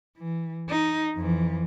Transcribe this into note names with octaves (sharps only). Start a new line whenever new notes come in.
E3
D#4
F2 E3